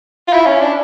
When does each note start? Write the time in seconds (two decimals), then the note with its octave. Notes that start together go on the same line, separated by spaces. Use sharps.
0.28 F4
0.33 E4
0.46 C#4
0.61 D4